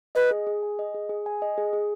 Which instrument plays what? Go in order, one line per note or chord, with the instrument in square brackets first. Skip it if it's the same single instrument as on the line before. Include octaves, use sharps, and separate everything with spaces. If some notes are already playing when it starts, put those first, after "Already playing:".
[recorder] B4 [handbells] D#5
[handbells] G#4
G#4
G#5
D#5
G#4
G#4
G#5
D#5
G#4
G#4